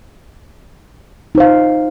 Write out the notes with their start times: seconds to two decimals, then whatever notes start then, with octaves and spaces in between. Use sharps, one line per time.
1.35 D#4
1.38 C5
1.40 F5